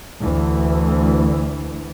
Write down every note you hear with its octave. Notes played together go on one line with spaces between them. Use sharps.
D2 E3